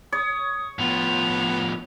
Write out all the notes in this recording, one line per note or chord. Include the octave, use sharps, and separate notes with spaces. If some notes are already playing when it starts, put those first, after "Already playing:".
C#5 D#6
A2 F3 B3 F7